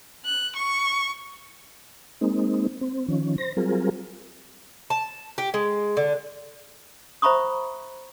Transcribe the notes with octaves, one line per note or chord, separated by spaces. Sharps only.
F#6
C#6
G#3 A#3 C4 D#4
C4
D#3 F3 C#4
C5 A#6
F#3 G3 C4 F4 G#4 A#4
A5
G4
G#3
D3
C5 E5 A#5 B5 C#6 D#6